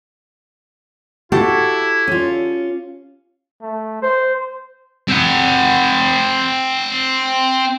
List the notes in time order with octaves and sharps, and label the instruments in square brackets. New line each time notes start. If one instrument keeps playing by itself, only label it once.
[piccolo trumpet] E4 [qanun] F#4 A4 [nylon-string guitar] G4
[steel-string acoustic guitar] C#4 F4
[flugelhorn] A3
C5
[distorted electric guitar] C4 F#5